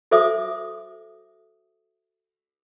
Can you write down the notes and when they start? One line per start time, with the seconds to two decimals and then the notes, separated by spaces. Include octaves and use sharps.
0.11 F#4 A4 C5 E5 D6 D#6